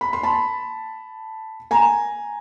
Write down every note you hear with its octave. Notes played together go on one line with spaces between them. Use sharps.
B5
C6
A5 B5
G#5 A#5